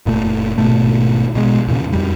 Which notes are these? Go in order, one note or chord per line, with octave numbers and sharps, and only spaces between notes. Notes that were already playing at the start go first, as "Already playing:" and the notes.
F#1 A#2 A3
G#1 B2 A3
A#1 B2 G#3
E2 A#2 C#3
F2 G3